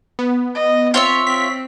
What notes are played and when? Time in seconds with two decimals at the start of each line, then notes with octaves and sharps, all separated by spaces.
0.19 B3
0.55 D#5
0.94 C4 F4 C#5 E5
1.27 C4 B6